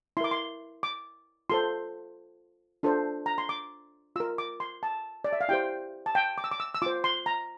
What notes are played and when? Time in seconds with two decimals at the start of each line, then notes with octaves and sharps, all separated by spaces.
0.17 E4 C6
0.21 A#4 D6
0.31 C6
0.83 D6
1.50 F4 A4 C5 C6
2.83 D4 F4 A4 C5
3.26 A#5
3.38 C6
3.49 D6
4.16 F4 A#4 E6
4.38 D6
4.60 C6
4.83 A5
5.24 D5
5.33 E5
5.41 F5
5.49 E4 G4 C5 G5
6.06 A5
6.15 G5
6.38 D6
6.44 E6
6.52 D6
6.60 E6
6.74 E6
6.82 F4 C5 D6
7.04 C6
7.26 A#5